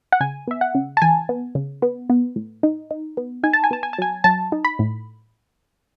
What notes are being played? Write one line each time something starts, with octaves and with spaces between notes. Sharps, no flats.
F#5
C#3 G#5
B3 E5
F#5
C#3
A5
E3 G#5
B3
C#3
B3
B3
A2
D#4
D#4
B3
D#4 G#5
A5
G#5
B3 A5
G#5
A5
F#3 G#5
F#3 A5
D#4
B5
A2